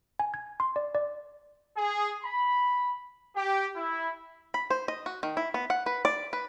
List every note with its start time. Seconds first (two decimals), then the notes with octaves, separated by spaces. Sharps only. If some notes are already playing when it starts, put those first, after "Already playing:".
0.19 G#5
0.34 G#6
0.60 C6
0.76 D5
0.95 D5
1.76 G#4
2.24 B5
3.35 G4
3.75 E4
4.54 B5
4.70 C5
4.88 D#5
5.06 F#4
5.23 D#3
5.37 E4
5.54 B3
5.70 F#5
5.86 B4
6.05 D5
6.33 B4